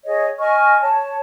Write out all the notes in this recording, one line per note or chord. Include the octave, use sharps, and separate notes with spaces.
G#4 C#5 D#5
D#5 G#5 C#6 F6
C#5 A5